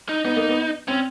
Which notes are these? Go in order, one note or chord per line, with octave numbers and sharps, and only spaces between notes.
D#4
B3 D#4
A#3
B3
C4 C#4